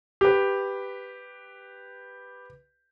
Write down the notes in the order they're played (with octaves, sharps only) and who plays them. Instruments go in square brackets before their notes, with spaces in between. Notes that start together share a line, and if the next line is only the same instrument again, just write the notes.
[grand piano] G4 B4